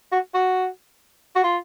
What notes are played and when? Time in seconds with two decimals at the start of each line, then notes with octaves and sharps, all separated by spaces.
0.12 F#4
0.34 F#4
1.36 F#4
1.44 F4